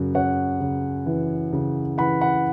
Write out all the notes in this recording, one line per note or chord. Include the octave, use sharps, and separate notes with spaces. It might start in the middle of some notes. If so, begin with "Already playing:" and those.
Already playing: F#2 C#3 F#4
C#3 C#5 F#5
C#3
E3
C#3
E3 F#5 B5
F#5 B5